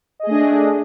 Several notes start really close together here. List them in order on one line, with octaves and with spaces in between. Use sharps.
D#5 G#4 A3 D4